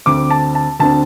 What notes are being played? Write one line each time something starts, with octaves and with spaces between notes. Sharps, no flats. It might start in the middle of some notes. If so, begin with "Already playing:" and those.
D2 D3 C4 D6
A5
A5
D2 D3 C4 A5